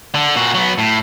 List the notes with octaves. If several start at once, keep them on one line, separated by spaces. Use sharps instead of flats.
D3
A#2 F#4
F#3 B3
A2